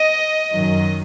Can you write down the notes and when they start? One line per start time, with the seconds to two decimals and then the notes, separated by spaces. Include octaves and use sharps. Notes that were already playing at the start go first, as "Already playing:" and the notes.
Already playing: D#5
0.54 F#2 D#3 F#3